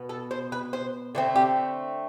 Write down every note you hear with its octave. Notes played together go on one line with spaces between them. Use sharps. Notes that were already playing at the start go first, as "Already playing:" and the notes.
Already playing: B2 B3
A4
C5
B4
C5
D3 A3 C4
G4